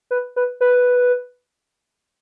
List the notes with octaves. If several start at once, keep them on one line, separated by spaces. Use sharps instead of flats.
B4
B4
B4